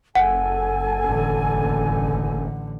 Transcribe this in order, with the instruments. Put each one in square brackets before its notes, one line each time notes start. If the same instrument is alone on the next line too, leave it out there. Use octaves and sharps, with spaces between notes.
[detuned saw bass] F#1 [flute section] A4 G#5 [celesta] F#5
[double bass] A1 D3